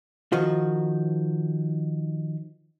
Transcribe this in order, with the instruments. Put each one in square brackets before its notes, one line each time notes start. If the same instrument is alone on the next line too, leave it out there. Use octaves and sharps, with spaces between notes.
[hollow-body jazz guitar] D#3 F3 F#4